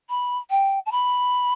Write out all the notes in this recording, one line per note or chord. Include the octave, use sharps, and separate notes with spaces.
B5
G5
A5
B5